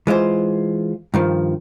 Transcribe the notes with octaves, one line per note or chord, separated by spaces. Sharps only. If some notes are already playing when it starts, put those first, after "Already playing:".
E3 G#3 F4 C5
G2 D#3 F3